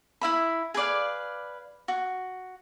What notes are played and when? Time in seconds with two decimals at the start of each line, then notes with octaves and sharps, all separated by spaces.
0.21 E4 E5 B5
0.74 G#4 B4 D5 F5
1.88 F#4